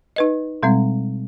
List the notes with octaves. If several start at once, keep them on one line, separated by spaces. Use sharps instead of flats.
D#4 B4 D#5
B2 G3 G#3 C4